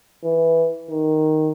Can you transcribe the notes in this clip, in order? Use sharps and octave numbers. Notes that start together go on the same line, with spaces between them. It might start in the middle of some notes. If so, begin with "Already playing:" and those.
E3
D#3